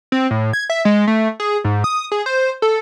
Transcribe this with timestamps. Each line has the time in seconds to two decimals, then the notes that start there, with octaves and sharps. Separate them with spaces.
0.12 C4
0.31 A2
0.53 G#6
0.70 E5
0.85 G#3
1.07 A3
1.40 G#4
1.64 G#2
1.84 D#6
2.12 G#4
2.26 C5
2.62 A4